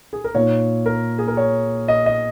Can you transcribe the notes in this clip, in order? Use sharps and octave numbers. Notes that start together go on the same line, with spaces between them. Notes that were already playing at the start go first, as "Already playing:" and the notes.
G#4
A#4
A#2 A#3 D#4 C#5
A#4
G#4
A#4
C#5
D#5
D#5